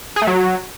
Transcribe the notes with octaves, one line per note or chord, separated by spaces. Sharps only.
G#4
A3
F#3